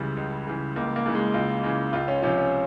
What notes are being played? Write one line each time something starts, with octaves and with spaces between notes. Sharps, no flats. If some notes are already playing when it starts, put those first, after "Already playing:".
Already playing: C#2 C#3 E3 G3
C#2
C#3 E3
C#2 A#3
A#3
C#3 E3
G#3
C#2 F4
C#3 E3
C#2 F4
C#4
C3 F3 C#4
C#4